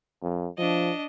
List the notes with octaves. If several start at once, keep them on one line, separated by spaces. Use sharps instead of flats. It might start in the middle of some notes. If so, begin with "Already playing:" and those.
F2
F3 D4 D#5